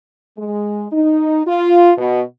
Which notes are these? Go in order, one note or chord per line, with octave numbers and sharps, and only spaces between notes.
G#3
D#4
F4
B2